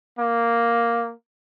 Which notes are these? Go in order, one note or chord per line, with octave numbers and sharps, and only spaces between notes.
A#3